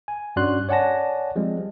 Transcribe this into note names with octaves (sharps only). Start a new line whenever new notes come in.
G#5
G2 C#4 F#4 D5 C6 F#6
C#5 D5 F#5 G#5 A5 A#6
F3 G3 G#3 C4